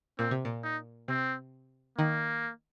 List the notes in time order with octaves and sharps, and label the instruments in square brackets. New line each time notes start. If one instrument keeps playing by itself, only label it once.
[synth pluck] A#2 [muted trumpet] C4
[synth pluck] C3
A#2
[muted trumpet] D#4
[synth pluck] C3 [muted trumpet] C4
[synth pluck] D#3 [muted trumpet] A#3